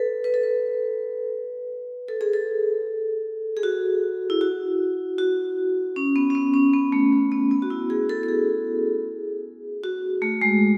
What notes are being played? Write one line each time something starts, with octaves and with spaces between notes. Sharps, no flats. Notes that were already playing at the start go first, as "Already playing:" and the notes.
Already playing: A4 B4
B4
A4
B4
A4
G#4
A4
G#4
F#4
E4
F#4
F#4
C#4
B3
C#4
B3
C#4
B3
A3
A3
B3
B3
F#4
E4
G#4
A4
A4
G#4
F#4
A3
G#3